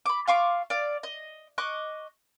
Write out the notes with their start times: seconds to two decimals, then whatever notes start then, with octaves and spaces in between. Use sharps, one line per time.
0.06 B5 D6
0.28 F4 F5 C#6 D6
0.70 D5 F5
1.03 D#5
1.58 D#5 C#6 D6 F#6